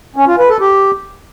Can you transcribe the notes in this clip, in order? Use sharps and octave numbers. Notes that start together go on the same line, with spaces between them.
C#4
F4
B4
A4
G4